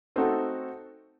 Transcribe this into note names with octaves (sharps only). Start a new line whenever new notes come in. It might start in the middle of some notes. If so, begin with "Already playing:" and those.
A3 C4 D#4 F#4 A4